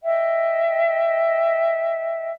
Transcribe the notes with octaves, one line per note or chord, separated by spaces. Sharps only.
D#5 E5 G5